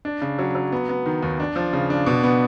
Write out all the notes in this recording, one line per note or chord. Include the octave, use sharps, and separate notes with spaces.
D4
C#3
F#3
F#3
B3
B3
D#3
D#2
D4
F3
C#3
D4
B2
B3